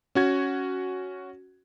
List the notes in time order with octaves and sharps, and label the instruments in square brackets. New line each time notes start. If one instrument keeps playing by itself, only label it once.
[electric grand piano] C#4 F#4 G#6